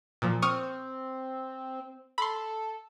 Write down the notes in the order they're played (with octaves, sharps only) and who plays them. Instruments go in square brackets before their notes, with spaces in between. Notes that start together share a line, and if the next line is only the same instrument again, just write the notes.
[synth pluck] A#2 F3
[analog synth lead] C4 [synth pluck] C#6 D#6 F6
[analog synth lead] A4 [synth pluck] B5 C6